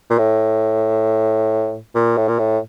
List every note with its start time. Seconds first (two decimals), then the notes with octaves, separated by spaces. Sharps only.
0.10 A#2
0.18 A2
1.95 A#2
2.17 A2
2.28 A#2
2.39 A2